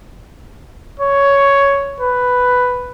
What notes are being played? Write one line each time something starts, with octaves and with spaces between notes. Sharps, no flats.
C#5
B4